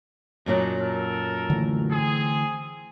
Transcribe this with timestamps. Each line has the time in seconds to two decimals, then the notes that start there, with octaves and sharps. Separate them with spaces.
0.46 F#2 A#2 F#3 D4 D#4 A#4
0.79 A4 A#4
1.50 D3 E3 A3
1.90 C4 G#4